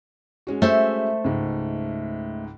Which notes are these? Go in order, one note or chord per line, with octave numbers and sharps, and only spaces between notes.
G#3 C#4 F#4
A3 C5 E5
C#2 G#2